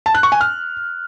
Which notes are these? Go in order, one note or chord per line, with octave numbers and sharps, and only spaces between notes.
A5
F#6
C#6
G#5
F6